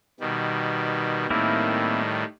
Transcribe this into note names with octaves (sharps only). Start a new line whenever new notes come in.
B2 D#3 G3
A2 D#3 G3 A#3 C4 E4